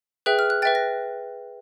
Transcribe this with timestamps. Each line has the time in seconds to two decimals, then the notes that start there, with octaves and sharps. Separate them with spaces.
0.26 G#4 B4 E5 G5 F#6
0.39 F6
0.50 F#6
0.62 B4 E5 G5 A6
0.75 A#6